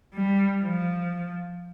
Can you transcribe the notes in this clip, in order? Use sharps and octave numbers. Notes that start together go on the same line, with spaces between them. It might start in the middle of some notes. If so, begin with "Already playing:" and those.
G3
F3